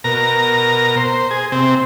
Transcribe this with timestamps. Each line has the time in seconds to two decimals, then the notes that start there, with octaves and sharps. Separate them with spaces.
0.04 B2 A#4 A#5
0.97 C5
1.31 G#4
1.52 C3 C4